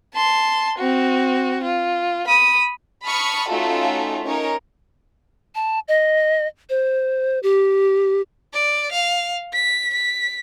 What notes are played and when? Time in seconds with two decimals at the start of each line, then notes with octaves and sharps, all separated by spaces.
0.14 A5 C6
0.78 C4 F#4
1.63 F4
2.27 B5 D#6
3.05 A5 B5 C#6 D#6 F6
3.48 A3 C#4 D#4 F4 F#4 A4
4.23 C#4 D#4 A#4 C#5
5.55 A5
5.88 D#5
6.70 C5
7.43 G4
8.54 D5
8.92 F5
9.53 B6
9.94 B6